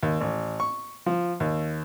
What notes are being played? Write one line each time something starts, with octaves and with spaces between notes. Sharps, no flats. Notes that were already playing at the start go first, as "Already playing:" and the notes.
D#2
A1
C#6
F3
D#2